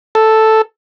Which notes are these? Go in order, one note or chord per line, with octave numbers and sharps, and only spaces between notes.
A4